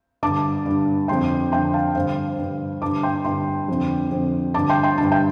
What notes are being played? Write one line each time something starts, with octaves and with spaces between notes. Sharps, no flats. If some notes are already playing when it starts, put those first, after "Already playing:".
G2 D3 A5 D6
G2 D3
F2 D3 G5 C6
F2 D3 G5 C6
F5 A5
G2 D3 C5 F5
G2 D3
G2 D3 A5 D6
G5 C6
G2 D3 G5 C6
F2 D3
F2 D3
G2 D3 A5 D6
G5 C6
G5 C6
G2 D3 A5
G5